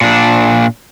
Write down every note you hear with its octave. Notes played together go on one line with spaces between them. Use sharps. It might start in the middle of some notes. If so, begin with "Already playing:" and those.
A#2 D4